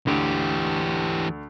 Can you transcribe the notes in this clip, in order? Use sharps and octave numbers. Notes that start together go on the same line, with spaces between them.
D2 E3 G4